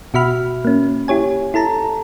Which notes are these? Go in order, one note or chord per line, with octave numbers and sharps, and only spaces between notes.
B2 F#4 E5 B5 F6
A#3 C#4
E4 G4 C#5 G#5
E4 A4 A5 A#5